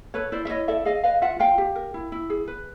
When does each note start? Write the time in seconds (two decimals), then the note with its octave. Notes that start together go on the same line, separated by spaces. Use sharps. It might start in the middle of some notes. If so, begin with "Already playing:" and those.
0.14 A4 B4 C#5
0.32 E4 C5 D5
0.45 E5
0.49 E4 C#5 D#5
0.68 A4 D5 E5
0.85 G#4 D#5 F5
1.04 B4 D#5 F5
1.22 F4 E5 F#5
1.39 F4 F5 G5
1.58 G4
1.76 A#4
1.94 E4
2.12 E4
2.30 G#4
2.48 B4